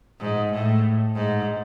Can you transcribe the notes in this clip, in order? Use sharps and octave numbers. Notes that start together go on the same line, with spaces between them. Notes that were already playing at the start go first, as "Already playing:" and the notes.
G#2
A2
G#2